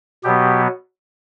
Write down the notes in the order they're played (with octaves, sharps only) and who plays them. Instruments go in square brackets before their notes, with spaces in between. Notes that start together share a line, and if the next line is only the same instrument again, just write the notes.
[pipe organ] B2 F#3 B3 G4